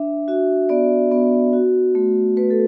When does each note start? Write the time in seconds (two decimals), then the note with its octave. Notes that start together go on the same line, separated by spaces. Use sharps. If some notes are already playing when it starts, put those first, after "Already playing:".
Already playing: D4 E5
0.28 F#4 E5
0.69 B3 D5
1.12 B3
1.53 F#4
1.95 A3
2.37 A3 B4
2.50 A4